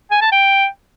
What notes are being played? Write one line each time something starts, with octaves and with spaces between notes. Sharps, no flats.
G#5
A5
G5